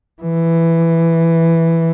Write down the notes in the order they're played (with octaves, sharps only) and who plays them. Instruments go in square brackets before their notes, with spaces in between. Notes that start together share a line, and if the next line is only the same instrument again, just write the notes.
[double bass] E3